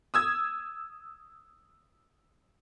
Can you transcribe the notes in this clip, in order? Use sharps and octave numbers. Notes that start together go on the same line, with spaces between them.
D#6 E6 G#6